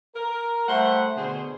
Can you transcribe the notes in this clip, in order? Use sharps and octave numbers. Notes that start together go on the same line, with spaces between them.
A#4
G3 A3 C5 F#5
B2 D3 G#4 C5 G#5